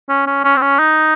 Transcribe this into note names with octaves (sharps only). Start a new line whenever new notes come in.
C#4
C#4
C#4
C4
C#4
D#4